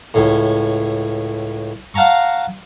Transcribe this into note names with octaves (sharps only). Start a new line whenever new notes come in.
C#2 A2
F5 F#5 A5 A#5 C#6